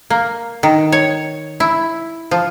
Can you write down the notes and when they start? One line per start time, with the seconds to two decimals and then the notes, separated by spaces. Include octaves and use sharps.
0.10 A#3
0.63 D#3
0.92 C#5
1.60 E4
2.31 F3